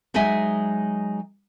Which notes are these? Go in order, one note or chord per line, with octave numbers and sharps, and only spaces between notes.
F#3 G#3 D#4 D#5 E5 G#5